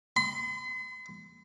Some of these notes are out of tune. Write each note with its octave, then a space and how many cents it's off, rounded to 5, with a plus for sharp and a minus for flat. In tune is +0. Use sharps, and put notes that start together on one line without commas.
C6 -45